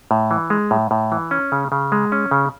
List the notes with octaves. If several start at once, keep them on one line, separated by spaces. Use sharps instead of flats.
A2
E3
G#3
A2
A2
E3
C#4
C#3
C#3
G#3
C#4
C#3